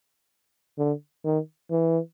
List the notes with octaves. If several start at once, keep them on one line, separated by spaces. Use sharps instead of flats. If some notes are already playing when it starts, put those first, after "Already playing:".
D3
D#3
E3